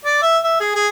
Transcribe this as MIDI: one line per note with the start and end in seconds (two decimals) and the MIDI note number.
0.05 0.19 74
0.23 0.38 76
0.43 0.56 76
0.61 0.72 68
0.75 0.87 68